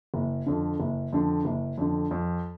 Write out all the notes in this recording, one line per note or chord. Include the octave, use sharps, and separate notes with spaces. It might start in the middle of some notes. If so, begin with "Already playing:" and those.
F#1
F2 D3
F#1
F2 D3
F#1
F2 D3
F2